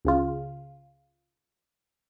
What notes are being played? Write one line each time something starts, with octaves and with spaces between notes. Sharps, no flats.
C#2 C#3 F4